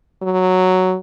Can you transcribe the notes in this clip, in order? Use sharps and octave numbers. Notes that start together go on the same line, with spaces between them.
F#3